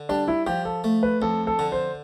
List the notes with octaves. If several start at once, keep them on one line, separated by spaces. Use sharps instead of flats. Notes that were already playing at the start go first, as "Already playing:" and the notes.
Already playing: D3
G3 D4
E4
F3 G4
A4
A3
B4
F2 A4
A4
D3
C5